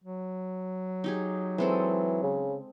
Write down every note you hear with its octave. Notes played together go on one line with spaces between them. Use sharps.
F#3
D#4 G4 G#4
E3 G#3 C4 A4
C#3